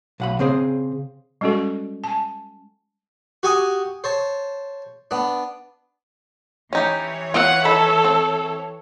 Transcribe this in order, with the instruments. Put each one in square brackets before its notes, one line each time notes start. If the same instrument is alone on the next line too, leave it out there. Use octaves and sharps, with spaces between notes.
[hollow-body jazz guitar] B1 F#5 B5
C#3 C4 G#4 C5
[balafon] G3 G#3 C#4 F#4 A4
G#5 A5
[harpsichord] F#4 G4 G#5 C#6 D#6
C5 C#5 A5
B3 D4
[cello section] E3 C#5 [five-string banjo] C#4 D#4 G4
[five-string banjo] F4 [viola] F#5
[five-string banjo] D#3 B5 [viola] A4
[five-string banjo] C4